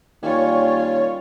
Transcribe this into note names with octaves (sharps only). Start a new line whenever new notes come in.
D#2 G3 C#4 F4 C#5